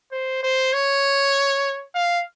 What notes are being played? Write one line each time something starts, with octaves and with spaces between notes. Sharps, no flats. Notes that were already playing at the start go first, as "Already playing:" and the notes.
C5
C5
C#5
F5